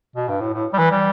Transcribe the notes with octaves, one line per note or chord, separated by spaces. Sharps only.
B2
G2
A2
A2
G3
E3
G3